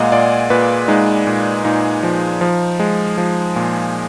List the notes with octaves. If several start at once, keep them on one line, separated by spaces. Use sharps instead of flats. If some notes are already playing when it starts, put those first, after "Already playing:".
Already playing: A#2 G#3 D#5 F5 F#5 A#5
A#2 D5
A#2 B4
G#3 D#4
A#2
A#2 D#4
F3
F3
G#3
F3
A#2